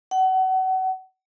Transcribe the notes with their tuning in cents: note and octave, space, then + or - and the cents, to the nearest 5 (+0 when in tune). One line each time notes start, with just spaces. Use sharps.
F#5 +30